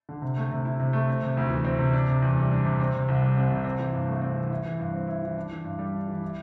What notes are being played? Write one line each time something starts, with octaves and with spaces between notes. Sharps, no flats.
D3
C3
A3
C3
E4
C3
A3
C4
C3
D2
E3
C4
C3
D4
C3
E2
G3
D4
C3
C4
C3
C2
G3
C4
C3
C4
E3
G2
A3
C4
E3
E4
E3
G2
C4
E4
E3
D4
E3
G2
G3
D4
E3
E4